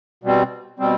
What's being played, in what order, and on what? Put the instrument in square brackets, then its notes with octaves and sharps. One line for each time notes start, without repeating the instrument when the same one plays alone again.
[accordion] B2 G3 C4
B2 G3 C4